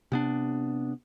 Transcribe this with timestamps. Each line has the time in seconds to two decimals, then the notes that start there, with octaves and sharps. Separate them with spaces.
0.12 C3 B3 D4